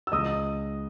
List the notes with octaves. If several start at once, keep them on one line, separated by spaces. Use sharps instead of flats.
E6
C#2 D#5 D#6